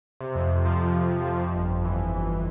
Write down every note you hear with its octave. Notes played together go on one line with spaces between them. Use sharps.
C3
F2
F2
F3
C3
F2
F2
F3
F2
G1
G1
E3
F2
G1